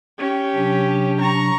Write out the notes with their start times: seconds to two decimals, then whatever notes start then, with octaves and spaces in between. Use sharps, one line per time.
0.18 C#4 G4
0.55 C3 F#3 D4
1.21 A#5 C#6